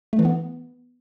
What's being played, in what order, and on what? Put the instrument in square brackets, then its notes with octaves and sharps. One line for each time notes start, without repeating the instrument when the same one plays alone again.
[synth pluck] A3
E3
B3